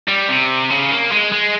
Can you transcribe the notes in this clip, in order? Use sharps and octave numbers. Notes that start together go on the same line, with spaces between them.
G3
C3
C#3
A#3
G#3
G#3